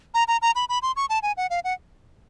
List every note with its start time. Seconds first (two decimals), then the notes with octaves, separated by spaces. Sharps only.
0.14 A#5
0.28 A#5
0.42 A#5
0.55 B5
0.69 B5
0.82 C6
0.96 C#6
1.09 A5
1.23 G#5
1.37 F#5
1.50 F5
1.64 F#5